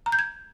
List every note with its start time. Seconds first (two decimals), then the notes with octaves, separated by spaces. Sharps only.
0.06 A#5
0.12 G6
0.19 G#6